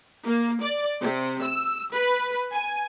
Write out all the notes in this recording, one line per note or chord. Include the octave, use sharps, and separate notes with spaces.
A#3
D5
C3
E6
B4
G#5